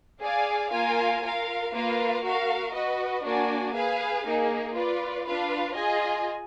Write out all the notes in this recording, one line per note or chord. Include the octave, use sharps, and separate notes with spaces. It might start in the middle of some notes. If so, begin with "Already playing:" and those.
G#4 D5 F5 G#5
A#3 F4 A#4 F5 G#5
F4 A#4 F5
A#3 F4 B4 F5
F#4 A#4 F5
F#4 B4 D#5
A#3 D4 F#4 D5 G#5
G#4 B4 F5 G#5
A#3 D#4 G#4
F4 B4 D5
D4 F4 B4 F5
F4 G#4 D#5 G#5